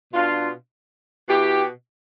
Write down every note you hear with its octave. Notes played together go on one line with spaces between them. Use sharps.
B2 D4 F4
B2 E4 G4